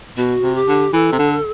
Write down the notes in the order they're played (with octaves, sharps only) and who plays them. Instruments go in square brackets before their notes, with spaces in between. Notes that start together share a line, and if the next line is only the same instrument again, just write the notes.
[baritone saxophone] B2 [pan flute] F#4
[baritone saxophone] C3
[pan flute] G4
[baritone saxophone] D3
[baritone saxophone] E3 [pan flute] A4
[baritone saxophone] C3
D3